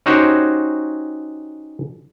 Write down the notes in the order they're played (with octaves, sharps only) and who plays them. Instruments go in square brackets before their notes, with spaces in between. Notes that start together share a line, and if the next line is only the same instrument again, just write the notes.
[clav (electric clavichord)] C#4 D#4 F#4 G4 C5 C#5